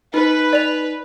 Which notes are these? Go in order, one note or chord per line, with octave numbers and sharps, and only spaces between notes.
D#4 B4
D5 F7